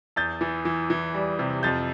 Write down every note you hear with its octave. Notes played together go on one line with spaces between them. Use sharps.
E2 G6 A6
E3
E3
E3
G3
C3
F2 G6 A6